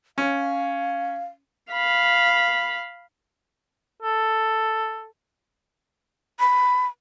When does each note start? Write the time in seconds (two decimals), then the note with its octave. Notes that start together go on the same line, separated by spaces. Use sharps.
0.18 C#4 F5
1.71 F5 B5
4.02 A4
6.40 B5